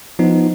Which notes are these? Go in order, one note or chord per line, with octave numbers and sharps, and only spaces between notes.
F3 B3 D#4